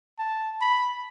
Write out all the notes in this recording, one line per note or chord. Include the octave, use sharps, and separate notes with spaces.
A5
B5